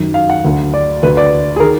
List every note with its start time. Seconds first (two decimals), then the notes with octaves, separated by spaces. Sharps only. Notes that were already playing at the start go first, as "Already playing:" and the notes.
Already playing: F#2 D#3
0.14 F5
0.30 F#5
0.45 D2 D3
0.74 D5
1.03 D2 D3 B4
1.17 D5
1.56 G#4
1.60 D#3 A#4